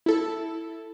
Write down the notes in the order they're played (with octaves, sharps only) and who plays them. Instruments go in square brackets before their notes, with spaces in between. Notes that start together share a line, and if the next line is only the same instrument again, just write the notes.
[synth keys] E4 A4